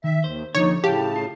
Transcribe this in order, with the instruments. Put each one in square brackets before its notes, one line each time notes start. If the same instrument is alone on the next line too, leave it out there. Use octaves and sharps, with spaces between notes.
[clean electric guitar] D#3 [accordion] E5
[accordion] D#2 [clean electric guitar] C5
[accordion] D#2 D#4 [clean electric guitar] D3 F3 [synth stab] C#5
[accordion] A2 C#3 A5 [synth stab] G4 [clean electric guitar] F5
[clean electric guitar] F4